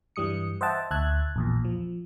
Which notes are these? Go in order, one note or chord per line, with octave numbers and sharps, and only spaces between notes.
G2 E3 G3 D#6 C#7
C5 D#5 E5 F#5 G5 A5
D2 E5 A5 F#6 G#6
A#1 E2 A#2
F3